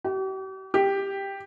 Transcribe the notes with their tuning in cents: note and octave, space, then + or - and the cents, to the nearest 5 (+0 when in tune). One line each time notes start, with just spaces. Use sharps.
G4 -45
G4 +5